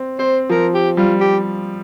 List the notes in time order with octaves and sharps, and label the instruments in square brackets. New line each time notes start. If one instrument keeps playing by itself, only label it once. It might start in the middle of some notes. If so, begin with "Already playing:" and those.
Already playing: [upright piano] C4
[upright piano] C4 [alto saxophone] C5
[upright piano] F3 [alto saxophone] A#4
[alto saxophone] G4
[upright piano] G3 [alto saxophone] F4
[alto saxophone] G4